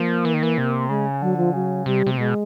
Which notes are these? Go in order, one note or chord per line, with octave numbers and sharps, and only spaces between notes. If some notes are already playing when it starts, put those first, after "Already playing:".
Already playing: F3 A#3
E3
D#3
E3
C3
C#3 G#3
D3 F#3
F3
C#3 F#3
C3 G3
C3
A3
B2 G#3